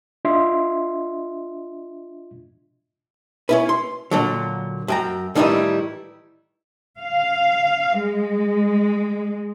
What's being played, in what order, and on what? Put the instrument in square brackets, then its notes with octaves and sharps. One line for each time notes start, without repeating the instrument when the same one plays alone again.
[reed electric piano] D4 F4 D#5 E5 C6
[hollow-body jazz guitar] C#4 E4 B4
C6
A#2 D3 F#3
F#2 G5 A#5
A2 D#3 E3 G3 D#4 E4
[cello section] F5
G#3